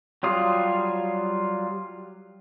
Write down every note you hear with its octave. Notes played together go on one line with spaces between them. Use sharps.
F#3 G3 F4 D#6